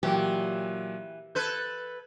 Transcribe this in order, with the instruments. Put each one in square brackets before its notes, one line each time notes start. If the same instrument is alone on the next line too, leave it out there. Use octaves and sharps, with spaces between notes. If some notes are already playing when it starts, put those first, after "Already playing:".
[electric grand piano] A#2 F#3 [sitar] E3 [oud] G4
[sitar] A4 B4 [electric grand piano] G6 G#6